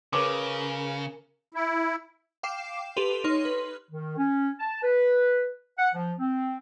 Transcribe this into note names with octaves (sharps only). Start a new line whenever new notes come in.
C#3 G#4 A#4 B4 C#5 D6
E4
F5 G5 D6 C7 E7
G4 A4 B4 C6 D#7 F7
D#4 C#5 C6 F6
B4
D#3
C#4
A5
B4
F#5
F3
C4